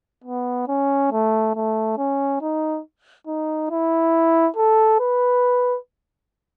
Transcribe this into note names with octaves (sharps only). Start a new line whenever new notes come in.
B3
C#4
A3
A3
C#4
D#4
D#4
E4
A4
B4